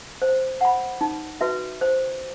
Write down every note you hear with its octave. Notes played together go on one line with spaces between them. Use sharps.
C5
F#5 B5
D#4
F#4 B4 E5
C5